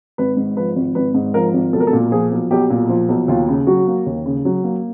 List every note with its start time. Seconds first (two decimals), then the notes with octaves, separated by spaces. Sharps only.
0.18 G#1 B4
0.37 G#2
0.57 F3 B4
0.76 G#1
0.95 G#1 B4
1.14 G#2
1.34 F3 A#4
1.53 G#1
1.73 B1 A4
1.80 A#4
1.87 A4
1.93 A#2
2.12 F3 G#4
2.31 B1
2.51 B1 G4
2.70 A#2
2.89 F3 F4
3.09 B1
3.28 D#2 F4
3.49 C#3
3.67 F#3 F#4
3.87 A#3
4.06 D#2
4.26 C#3
4.45 F#3
4.64 A#3